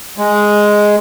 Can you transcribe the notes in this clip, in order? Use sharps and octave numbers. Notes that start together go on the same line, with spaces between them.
G#3